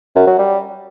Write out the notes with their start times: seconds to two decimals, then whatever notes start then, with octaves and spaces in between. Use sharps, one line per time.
0.16 F#2
0.27 F#3
0.38 G3